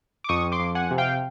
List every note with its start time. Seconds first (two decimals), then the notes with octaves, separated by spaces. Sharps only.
0.24 D6
0.29 F2 C#6 D#6
0.52 C6 D6
0.59 F2
0.75 F#5 G#5
0.91 C3
0.98 F5 G5